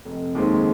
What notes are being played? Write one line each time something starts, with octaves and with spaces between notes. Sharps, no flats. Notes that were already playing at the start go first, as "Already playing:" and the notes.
F1
D#2 D#3 G#3 C4